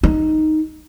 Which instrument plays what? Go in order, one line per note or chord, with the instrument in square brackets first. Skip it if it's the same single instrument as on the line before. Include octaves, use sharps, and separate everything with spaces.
[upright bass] D#4